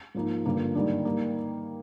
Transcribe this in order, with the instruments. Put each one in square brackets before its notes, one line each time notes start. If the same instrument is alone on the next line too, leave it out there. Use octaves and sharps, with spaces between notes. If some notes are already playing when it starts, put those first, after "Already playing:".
[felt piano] G#2 F3 A#3 D#4
G2 D3 F3 A#3
G#2 D#3 G3 A#3 D4
G3 A#3 D#4